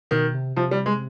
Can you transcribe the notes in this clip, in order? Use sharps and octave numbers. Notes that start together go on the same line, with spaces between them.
B2 D#3
C3
C3 F3
G3
G#3